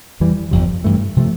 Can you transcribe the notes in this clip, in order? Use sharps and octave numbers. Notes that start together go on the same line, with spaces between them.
F2 E3 G3
G1 F2 C3
G2 E3 A3
C3 F3 A3